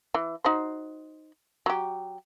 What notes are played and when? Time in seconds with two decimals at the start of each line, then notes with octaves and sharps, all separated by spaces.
0.14 E3
0.44 D#4 F#4 C5
1.66 F#3 G4